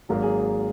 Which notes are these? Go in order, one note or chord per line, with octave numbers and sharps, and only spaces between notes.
G#1 G#2 F#3 A#3 A#4
G#4